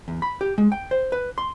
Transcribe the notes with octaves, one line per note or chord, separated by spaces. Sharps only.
E2
B5
G4
G#3
G5
C5
B4
C6